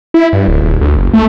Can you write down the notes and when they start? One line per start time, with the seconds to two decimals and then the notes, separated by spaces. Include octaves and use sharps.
0.14 E4
0.33 G2
0.48 D1
0.62 D#1
0.81 D2
0.97 F#1
1.14 A3